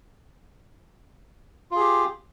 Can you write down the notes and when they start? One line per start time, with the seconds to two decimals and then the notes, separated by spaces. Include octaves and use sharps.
1.71 F4
1.75 G#4
1.80 G4